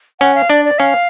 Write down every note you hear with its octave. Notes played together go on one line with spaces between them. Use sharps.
C#4 F#5
F5
D4 D5
D5
C#4 F5